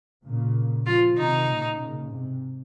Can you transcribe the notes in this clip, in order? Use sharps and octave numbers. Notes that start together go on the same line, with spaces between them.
A#2 C#3
C#3 F3 F4
C3 D#3 D#4
A#2 C#3
A#2 C#3
G#2 C3